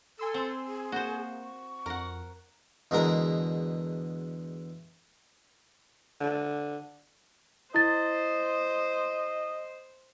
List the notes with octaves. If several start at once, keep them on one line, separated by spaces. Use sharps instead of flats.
A4 G#5 C6 E6
C4
G#4
A#3 F#4 C5
C#6
F2 A#4 F#5
E2 B2 D3 G#3 A#4 A#5
D3
E4 C5 D#5 A6